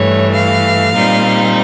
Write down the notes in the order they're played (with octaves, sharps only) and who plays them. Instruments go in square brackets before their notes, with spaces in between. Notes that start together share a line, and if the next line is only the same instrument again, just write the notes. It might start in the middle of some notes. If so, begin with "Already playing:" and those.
Already playing: [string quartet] G2 E3 A3 C#5
F5
A#2 G3 C4 D#4